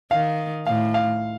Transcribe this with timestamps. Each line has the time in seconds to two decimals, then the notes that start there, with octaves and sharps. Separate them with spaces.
0.11 D#3 F5
0.67 A2 F5
0.94 F5